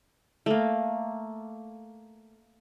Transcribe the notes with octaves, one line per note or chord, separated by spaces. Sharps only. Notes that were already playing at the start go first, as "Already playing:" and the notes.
A3 A#3